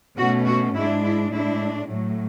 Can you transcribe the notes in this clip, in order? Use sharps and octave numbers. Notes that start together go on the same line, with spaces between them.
B2 A3 C#4 F#4
F#4
G#2 G#3 D4 E4
E4
A2 G#3 D4 E4
A2 F#3 A3